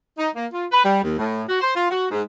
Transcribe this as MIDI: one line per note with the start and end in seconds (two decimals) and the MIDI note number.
0.18 0.29 63
0.35 0.45 58
0.52 0.67 65
0.72 0.83 71
0.84 1.01 55
1.03 1.18 39
1.19 1.43 45
1.48 1.58 66
1.61 1.73 72
1.75 1.91 65
1.91 2.06 66
2.11 2.21 44